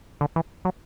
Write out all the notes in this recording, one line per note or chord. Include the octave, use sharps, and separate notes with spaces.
D3
E3
F#3